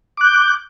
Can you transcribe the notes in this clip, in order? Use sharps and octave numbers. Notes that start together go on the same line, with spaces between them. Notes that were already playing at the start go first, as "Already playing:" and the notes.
D6 F#6 G6